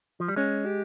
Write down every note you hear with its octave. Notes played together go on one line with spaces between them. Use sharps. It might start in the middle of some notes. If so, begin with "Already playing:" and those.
F3
G3
G#3 C#4
G4